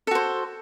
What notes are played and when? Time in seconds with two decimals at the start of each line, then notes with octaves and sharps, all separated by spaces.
0.07 A4
0.11 F#4
0.15 C5